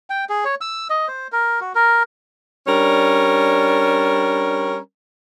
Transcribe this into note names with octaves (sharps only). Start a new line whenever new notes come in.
G5
G#4
C#5
E6
D#5
C5
A#4
F#4
A#4
G3 C#4 D4 A#4